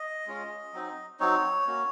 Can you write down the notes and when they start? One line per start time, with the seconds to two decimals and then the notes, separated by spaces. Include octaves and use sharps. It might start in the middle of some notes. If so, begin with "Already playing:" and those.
Already playing: D#5
0.27 G#3 C#4 F4
0.73 F#3 C4 D#4
1.20 F#3 C4 D#4 C#5
1.66 A#3 C#4 F#4